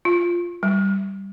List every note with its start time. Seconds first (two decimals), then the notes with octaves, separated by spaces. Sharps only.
0.05 F4
0.63 G3